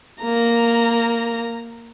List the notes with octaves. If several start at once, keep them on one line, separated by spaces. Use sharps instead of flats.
A#3 A#5